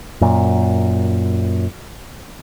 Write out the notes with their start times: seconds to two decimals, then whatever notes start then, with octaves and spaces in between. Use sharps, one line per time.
0.21 F#2 A#2